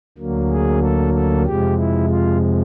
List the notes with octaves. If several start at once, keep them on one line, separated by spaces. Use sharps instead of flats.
D2 D3 F#3 A#3
G#4
A4
A4
F2 C3 F3 G#3 G4
E4
F4